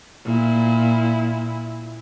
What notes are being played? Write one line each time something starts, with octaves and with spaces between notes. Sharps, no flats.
A#2 E4